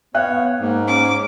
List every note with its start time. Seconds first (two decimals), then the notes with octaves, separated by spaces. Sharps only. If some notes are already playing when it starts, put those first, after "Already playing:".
0.15 B3 C#5 F5 G5 F#6
0.59 G#2 A#3
0.88 C#4 D6